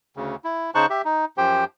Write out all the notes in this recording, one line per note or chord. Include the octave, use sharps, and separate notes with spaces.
D2 C#3
E4
C#3 D#4 C5 A5 C#6 F#6
G4 E5
D#4
F#2 F3 G4 C5 G5